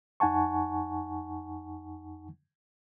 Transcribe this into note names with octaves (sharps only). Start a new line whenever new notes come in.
F2 D#4 F#5 G#5 A5 C#6